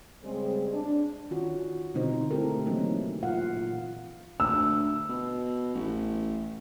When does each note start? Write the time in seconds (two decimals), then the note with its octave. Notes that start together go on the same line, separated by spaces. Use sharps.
0.24 C#3 G3 G#3 C4 G#4
0.73 D4
1.31 D#3 C#4 F4 F#4
1.94 B2 D3 C4 D#4 E4 C5
2.31 A3 C4 E4 G4 A4 A#4
2.66 E3 F#3 A#3 C4 C#4 D#4
3.23 A#2 F4 F5 F#5
3.57 F4
4.40 D2 E6
5.09 B2
5.75 A1